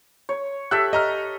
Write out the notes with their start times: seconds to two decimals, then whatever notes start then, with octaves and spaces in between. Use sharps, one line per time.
0.29 C#5
0.71 G4 A4 E5 E6 F#6
0.93 D#5 A#5 F6